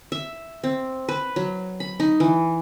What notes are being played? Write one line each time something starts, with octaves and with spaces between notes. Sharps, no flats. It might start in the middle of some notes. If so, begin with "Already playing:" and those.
E5
C4
B4
F#3
B5
D#4
E3